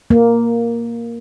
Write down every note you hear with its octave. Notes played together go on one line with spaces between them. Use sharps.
A#3